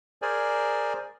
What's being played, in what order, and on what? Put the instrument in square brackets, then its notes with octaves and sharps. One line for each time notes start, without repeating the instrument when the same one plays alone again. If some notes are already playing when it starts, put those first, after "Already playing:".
[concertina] G#4 A#4 C5 D5 G#5